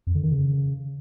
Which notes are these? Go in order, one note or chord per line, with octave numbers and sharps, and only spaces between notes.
F2
D3
D#3
C#3